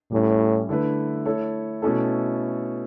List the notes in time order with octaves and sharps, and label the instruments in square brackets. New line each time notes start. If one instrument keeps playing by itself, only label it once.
[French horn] A2 [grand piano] G3 C#4 E4
[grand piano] D3 A3 E4 B4
A3 E4 A4 C#5
B2 A3 C#4 E4 A4